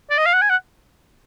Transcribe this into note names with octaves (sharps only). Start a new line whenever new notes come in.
D5
D#5
F5
F#5
G#5
F#5